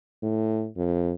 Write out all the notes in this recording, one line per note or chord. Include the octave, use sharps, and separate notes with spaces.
A2
F2